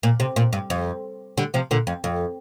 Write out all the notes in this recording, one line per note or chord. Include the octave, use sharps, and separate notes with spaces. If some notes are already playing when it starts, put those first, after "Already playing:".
A#2
C3
A#2
G2
F2
D3 G3
C3 F3
A#2 D3
F2
F2